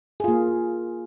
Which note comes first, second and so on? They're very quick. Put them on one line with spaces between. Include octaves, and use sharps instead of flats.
G#4 F4 A#3